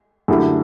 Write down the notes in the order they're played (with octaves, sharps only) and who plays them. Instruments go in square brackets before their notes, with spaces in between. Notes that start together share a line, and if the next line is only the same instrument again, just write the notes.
[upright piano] F#2 D3 A3 E4 G4